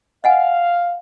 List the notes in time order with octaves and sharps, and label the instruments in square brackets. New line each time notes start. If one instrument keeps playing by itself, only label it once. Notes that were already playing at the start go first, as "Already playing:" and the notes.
[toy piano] D#5 F#5 G#5 [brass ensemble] F5